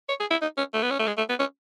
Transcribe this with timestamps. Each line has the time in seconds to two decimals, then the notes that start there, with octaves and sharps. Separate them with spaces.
0.09 C#5
0.20 G#4
0.31 E4
0.42 D#4
0.57 C#4
0.74 A3
0.82 B3
0.90 C#4
0.99 A3
1.07 G#3
1.17 A3
1.29 B3
1.39 C#4